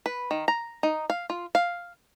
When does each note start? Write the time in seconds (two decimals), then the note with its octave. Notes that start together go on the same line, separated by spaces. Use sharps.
0.06 B4
0.31 D#3
0.48 A#5
0.83 D#4
1.10 F5
1.30 F4
1.55 F5